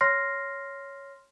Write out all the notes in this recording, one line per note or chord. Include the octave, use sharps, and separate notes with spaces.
C#5 C6 F6 A#6 C7